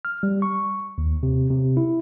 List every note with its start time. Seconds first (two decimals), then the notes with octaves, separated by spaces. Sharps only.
0.05 F6
0.23 G3
0.42 C#6
0.98 D#2
1.23 C3
1.50 C3
1.77 E4